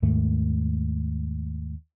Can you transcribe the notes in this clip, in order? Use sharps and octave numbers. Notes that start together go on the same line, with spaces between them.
D#2 G#2 D#3 A3